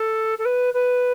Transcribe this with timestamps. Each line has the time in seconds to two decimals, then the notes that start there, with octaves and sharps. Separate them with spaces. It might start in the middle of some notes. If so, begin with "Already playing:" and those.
Already playing: A4
0.39 A4
0.45 B4
0.74 B4